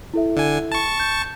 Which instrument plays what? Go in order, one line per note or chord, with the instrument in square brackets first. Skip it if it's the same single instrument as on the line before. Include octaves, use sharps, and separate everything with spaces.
[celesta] E4 A4 E5
[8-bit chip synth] D3 G#5
A5 C#6
[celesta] G6